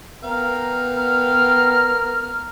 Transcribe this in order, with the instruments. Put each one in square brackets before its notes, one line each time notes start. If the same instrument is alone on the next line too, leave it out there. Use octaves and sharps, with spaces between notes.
[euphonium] B3 [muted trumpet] A#4 [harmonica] F5 G5
[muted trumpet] A#4 [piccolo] F6